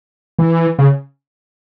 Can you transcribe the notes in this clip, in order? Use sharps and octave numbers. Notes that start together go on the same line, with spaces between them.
E3
C#3